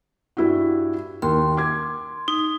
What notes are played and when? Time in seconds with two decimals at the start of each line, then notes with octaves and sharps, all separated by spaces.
0.37 G2 E4 F#4
1.22 D#2 C6
1.57 D6 G#6
2.28 D#4